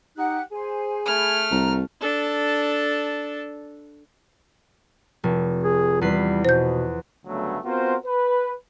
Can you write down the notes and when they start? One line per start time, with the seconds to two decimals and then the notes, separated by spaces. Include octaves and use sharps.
0.17 D#4 G4 F#5 F#6
0.52 G#4 C5 G#5
1.05 A3 G#5 B5 F6 G#6
1.52 C2 A#5
2.01 D4 A4
5.24 F1
5.63 G#4
6.01 E2 G3 B4 C7
6.45 B2 C5 G6
7.26 D2 G2 C#3 F#3 A3 B3
7.65 B3 C4 F4 F#4 A#4 C5
8.06 B4